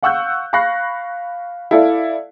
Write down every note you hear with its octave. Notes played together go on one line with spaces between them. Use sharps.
F5 F#5 C#6 E6 F#6 G6
F5 B5 C#6 F#6 A#6 C7
E4 A4 D5 F5